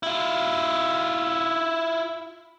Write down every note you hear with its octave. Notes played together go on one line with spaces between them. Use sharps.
E4 F4